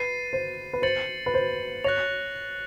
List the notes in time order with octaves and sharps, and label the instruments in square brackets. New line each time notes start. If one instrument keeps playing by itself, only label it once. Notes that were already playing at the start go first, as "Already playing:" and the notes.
Already playing: [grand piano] B4 [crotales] A6 C7 D#7
[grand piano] C5
B4
[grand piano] C5 [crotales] A6 C#7 F#7
[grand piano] B4
C5
[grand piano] C#5 [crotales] F#6 A#6 C#7 F7